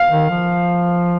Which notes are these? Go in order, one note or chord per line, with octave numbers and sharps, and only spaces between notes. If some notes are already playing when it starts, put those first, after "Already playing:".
Already playing: F5
D#3
F3